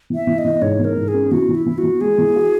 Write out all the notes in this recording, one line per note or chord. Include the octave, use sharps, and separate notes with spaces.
E3
E5
E3
D#5
E3
G#2 C#5
E3
A#4
G#2
G#4
C#4
E3 F#4
E3
E4
E3
F#4
E3
G#3 G#4
E3
F#4